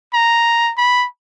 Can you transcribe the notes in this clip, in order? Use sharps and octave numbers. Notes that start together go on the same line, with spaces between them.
A#5
B5